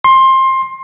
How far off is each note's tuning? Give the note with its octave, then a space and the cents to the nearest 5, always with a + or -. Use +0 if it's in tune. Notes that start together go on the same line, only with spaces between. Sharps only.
C6 +20